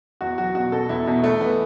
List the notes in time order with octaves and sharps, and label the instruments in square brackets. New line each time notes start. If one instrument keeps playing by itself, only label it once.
[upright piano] E2 F#4
F#3 F#4
B2 F#4
B2 A4
E2 E4
B2
A3
E3 B3